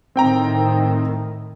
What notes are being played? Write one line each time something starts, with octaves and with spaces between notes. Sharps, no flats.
A2 D#3 C4 G5 A#5